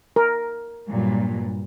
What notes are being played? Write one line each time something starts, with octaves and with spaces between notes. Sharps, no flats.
A#4
G2 A#2 F#3